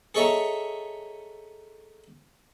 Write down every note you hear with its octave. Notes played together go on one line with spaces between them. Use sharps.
G#4 A4 C#5 D#5 E5 A#5